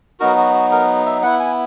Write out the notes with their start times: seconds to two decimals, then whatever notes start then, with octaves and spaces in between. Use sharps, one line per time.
0.20 F#3 B3 D#4 F#4 A#4
0.38 F#4
0.54 F#4
0.72 A#4
1.06 E5
1.23 B3 E4 F#5
1.40 G#5